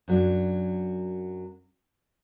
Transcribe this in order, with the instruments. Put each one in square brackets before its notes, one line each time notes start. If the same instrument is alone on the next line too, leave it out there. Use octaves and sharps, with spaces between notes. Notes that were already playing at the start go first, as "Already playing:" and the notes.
[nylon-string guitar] F#2 F#3 D4